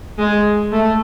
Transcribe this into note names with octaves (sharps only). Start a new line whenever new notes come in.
G#3
A3